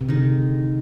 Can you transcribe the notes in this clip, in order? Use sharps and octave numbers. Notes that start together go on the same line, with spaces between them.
C3
D3 D#3 G#3 D#4